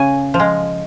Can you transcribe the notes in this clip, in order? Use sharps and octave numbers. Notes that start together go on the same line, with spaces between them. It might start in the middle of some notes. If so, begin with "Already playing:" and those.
Already playing: C#3 G#5
F3
G#3